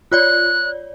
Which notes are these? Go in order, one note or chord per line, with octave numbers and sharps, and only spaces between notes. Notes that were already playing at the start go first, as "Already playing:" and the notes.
F4 C#5 D5 F#6